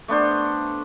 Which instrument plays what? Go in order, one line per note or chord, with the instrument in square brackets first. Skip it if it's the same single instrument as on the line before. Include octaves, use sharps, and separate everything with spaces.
[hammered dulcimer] A3 B3 D4 C5